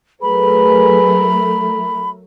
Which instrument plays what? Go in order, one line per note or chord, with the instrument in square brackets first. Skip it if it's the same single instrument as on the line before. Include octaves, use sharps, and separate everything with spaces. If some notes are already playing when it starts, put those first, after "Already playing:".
[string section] F#3 A3 A#4 [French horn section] G#4 B4 [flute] B5